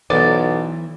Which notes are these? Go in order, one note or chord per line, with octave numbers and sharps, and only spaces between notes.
B1 E3 B3 A4 C5 D5